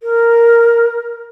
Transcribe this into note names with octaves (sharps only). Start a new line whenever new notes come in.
A#4